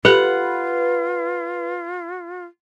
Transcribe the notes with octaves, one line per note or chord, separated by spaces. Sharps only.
F4 G4 A4 B4 F#5